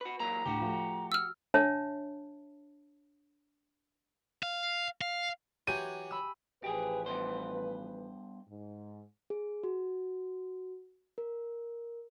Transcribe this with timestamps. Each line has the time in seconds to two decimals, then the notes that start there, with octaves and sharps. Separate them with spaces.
0.01 F#4 B4
0.20 E3 F#3 A#3 A#5
0.46 D2 A2 D3 F#4 G4
0.61 F3 A3
1.12 E6 F6
1.54 D4 C#5 E5 A5
4.43 F5
5.01 F5
5.67 E3 F#3 G4 G#5 D#7
6.11 B5 E6
6.64 A1 F3 G4 G#4 B4
7.06 G2 B2 C5
8.49 G#2
9.30 G#4
9.64 F#4
11.18 A#4